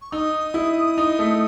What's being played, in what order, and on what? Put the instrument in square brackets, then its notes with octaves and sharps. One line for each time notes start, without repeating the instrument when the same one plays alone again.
[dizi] C#6
[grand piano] D#4 [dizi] D#6 E6
[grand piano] E4
D#4
A3